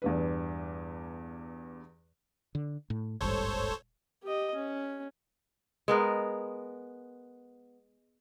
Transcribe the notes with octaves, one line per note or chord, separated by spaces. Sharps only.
E2 G2 B4
D3
A2
D#1 G#1 G2 A4 C5 C#5
G4 D#5
C#4
G#3 B3 A#4